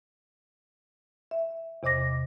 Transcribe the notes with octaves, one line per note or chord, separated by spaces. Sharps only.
E5
E2 C3 D#5 D6 A#6